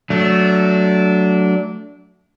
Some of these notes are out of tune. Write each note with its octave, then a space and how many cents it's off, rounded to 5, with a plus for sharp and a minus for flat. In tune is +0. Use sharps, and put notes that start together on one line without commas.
F#3 +0 A3 +0 D4 -20